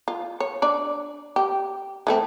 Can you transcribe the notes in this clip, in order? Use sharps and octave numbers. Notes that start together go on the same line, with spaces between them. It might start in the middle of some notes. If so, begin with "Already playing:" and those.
F4
C#5
D4 D5
G4
E3 A3 C4